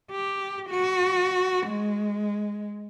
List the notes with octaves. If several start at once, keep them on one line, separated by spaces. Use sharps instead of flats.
G4
F#4
G#3